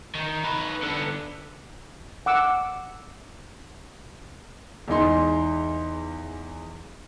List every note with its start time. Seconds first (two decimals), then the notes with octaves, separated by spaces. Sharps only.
0.15 D#3
0.44 D#4 B4
0.82 D3 B3
2.26 F#5 D6 E6
4.88 E2 G#3 D#4 C6